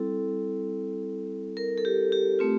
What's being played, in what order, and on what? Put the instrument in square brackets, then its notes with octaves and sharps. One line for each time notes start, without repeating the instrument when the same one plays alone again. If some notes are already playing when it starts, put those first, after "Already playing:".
Already playing: [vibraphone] G3 C4 E4 A4
A#4
A4
G4
G4
A3 C4 F4